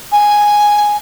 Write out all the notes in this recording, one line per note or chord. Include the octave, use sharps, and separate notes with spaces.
G#5